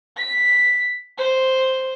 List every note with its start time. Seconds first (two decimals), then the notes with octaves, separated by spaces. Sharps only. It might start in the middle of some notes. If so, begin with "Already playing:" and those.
0.17 B6
1.18 C5